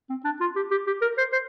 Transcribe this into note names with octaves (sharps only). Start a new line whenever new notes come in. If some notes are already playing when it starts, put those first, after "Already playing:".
C4
D4
F4
G4
G4
G4
A#4
C5
C5